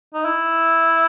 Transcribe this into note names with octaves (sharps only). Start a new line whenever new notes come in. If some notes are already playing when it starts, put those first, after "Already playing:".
D#4
E4